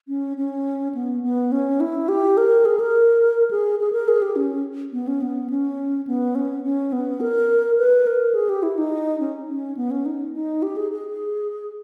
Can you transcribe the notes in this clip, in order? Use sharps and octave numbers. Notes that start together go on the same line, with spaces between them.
C#4
C#4
B3
B3
C#4
E4
G4
A#4
G#4
A#4
G#4
G#4
A#4
G#4
G4
C#4
B3
C#4
B3
C#4
B3
C#4
C#4
B3
A#4
B4
A#4
G#4
G4
E4
D#4
C#4
C#4
B3
C#4
D#4
D#4
G4
G#4
G#4